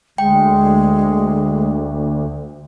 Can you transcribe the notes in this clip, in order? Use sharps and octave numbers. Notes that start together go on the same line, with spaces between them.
D2 G#3 G5